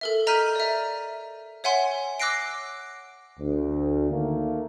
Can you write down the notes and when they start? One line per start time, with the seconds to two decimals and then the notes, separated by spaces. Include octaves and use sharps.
0.01 A4 A#4 E5
0.27 D#5 A#5 F6 G6 B6 D#7
0.55 D5 E5
1.64 C#5 E5 F#5 G#5 C6
2.20 D6 E6 F#6 A#6 C7 D7
3.40 D2
4.11 D#3 A3 A#3